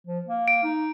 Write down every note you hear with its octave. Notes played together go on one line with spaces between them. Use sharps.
F3
A#3
D7
D#4